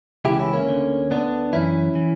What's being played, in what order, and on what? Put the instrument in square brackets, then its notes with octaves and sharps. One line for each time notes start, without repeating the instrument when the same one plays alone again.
[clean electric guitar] C#2 C#3 E3 E4 G4
C#4 E4
A#3 C#4
D2 D3
D2 D3 B3 D4
F#2 E3 C#4 E4
E3